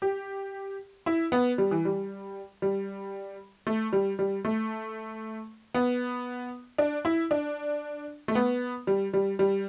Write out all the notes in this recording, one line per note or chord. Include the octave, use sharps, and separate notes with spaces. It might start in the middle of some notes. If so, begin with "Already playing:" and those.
G4
E4
B3
G3
E3
G3
G3
A3
G3
G3
A3
B3
D4
E4
D4
A3
B3
G3
G3
G3